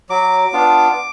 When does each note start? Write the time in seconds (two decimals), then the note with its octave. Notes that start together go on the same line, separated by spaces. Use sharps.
0.09 F#3 D6
0.53 B3 D4 F4